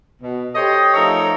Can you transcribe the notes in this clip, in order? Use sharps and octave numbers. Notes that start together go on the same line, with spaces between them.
B2
G4 A4 C5 C#5 D#5
F3 A3 D#4 A4 A#4 C#5